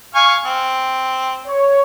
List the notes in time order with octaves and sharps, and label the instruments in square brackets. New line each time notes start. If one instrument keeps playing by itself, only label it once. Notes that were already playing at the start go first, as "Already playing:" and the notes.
[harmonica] F5 G#5 C#6
C4
[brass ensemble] C#5